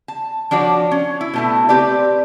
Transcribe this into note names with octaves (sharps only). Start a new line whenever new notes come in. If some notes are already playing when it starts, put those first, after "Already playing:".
A5
F3 D4 F#4 C#5 D5
C#4
E4
B2 A3 E4
C4 G4 B4 D5